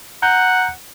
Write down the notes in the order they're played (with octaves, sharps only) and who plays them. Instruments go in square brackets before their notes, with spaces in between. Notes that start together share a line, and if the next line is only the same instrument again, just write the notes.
[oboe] F#5 [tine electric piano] A#5 G6